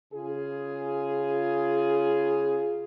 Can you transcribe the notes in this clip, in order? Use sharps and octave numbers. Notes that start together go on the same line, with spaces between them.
C#3 F4 G#4